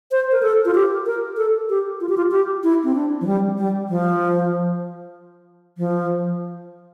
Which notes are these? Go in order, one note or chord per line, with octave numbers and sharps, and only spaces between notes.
C5
A#4
A4
F4
G4
A#4
A4
G4
F4
G4
F4
G4
E4
C4
D4
F3
G3
G3
F3
F3